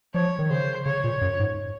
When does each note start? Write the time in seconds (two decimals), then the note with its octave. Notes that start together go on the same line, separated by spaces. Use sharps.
0.14 F3 C#5
0.39 D#3
0.50 C#3 C5
0.86 C#3 C#5
1.04 A#2
1.21 F#2
1.39 G#2